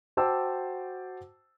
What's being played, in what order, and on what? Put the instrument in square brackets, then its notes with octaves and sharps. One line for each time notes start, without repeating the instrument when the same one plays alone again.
[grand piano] F#4 C5 G5 A5 D6 E6